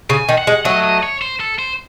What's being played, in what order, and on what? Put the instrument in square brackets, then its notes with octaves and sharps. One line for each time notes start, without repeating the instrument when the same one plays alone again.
[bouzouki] C#3 [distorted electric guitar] G#5
[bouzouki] D#3
[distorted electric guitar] F#5
[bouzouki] G#3
[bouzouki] F#3 A3 [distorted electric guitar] D#5
[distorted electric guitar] D#5
C#5
C5
A4
C5